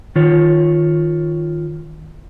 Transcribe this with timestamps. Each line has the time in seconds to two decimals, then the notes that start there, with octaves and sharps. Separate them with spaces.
0.16 D#3 F4 C#5